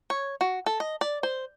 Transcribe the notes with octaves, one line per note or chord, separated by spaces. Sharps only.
C#5
F#4
A4
D#5
D5
C5